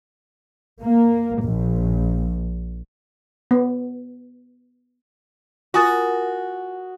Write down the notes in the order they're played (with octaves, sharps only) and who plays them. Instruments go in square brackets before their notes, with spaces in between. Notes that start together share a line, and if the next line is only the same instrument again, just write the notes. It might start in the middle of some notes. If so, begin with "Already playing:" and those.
[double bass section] A#3
A#1
[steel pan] B3
[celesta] F4 G#5 A6 [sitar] F#4 [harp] A#4 D#6 A#6